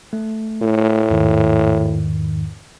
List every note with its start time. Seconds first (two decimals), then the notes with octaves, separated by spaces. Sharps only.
0.13 A3
0.62 A2
1.10 E2 G#2 D#3